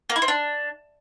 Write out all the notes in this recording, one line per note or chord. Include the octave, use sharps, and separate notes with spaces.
A#3
E4
C4
D4